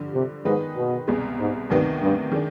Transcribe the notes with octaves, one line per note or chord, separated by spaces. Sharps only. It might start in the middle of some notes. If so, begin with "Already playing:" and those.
Already playing: G2 D3 F3
C3
G#2 D#3 G#3 B3 D#4 B4
B2
C2 B2 G#3
G#2
D2 G2 C3 D#3 B3 D#4
G2
D#3 G#3 D4